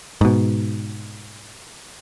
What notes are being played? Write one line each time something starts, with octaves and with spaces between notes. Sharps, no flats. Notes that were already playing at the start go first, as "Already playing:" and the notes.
G#2 B2